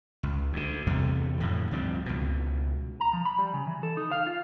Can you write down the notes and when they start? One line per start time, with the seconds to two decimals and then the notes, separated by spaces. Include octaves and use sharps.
0.23 C#2
0.53 D2 D3
0.87 E2 C3 G3 A3
1.40 F2 A2 D3
1.71 D2 G2 F3 C4
2.06 C#2 B2
3.00 A#5
3.13 F3
3.25 B5
3.38 G3
3.54 C#3
3.67 E3
3.83 A4
3.97 D#4
4.12 F5
4.27 F4